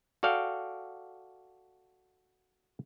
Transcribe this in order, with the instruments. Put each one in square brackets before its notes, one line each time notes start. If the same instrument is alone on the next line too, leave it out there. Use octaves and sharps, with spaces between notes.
[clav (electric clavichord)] F#4 A4 D5 F5 G5